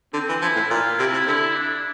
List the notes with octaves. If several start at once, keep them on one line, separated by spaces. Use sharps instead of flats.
D3 C4
E3
F3 E4
A2
A#2 F4
C3 E4
C3
D3 E4
D4